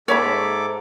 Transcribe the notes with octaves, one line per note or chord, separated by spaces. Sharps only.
G#2 A4 C#5 E5 B5 D6